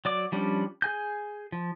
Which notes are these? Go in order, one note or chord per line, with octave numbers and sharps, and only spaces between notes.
F#3 D5 D6
F3 G3 C#4 D4
G#4 G#5 G6
F3